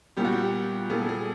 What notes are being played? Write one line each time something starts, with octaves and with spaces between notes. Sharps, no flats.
A#2 G3 B3 G4
F#4
G4
A#2 G3 B3 G#4
A4
G#4